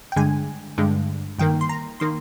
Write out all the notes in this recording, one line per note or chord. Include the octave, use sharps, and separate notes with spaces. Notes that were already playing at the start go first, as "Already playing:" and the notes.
G5
G2 D3 G#3 G#5
G2 D3 G#3
G2 D#3 A#3 G5
C6
A#5
D#3 A#3 C6